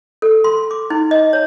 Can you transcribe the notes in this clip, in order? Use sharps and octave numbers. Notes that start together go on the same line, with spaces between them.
A4
C6
D6
D#4
D#5
C#5